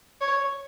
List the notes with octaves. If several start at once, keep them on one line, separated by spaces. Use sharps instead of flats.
C#5